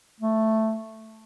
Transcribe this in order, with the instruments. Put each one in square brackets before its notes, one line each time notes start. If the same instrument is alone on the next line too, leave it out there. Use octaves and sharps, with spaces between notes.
[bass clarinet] A3